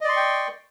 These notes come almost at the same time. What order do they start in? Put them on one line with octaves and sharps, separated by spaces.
D#5 D5 C6 C#6 G5